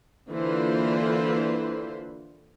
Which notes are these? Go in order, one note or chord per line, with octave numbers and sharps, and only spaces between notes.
D3 E3 A#3 F4 B4 C5